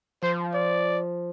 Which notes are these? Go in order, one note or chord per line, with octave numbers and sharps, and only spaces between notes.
F3 C5
D5